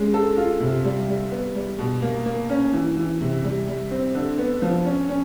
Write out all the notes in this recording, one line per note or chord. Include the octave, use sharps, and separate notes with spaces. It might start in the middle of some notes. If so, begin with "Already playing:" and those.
Already playing: G#3 C#4
A4
F4
C3
G3
G3
B3
G3
B2
A#3
A#3
C#4
E3
E3
C3
G3
G3
C4
D3
B3
F3
C#4
C#4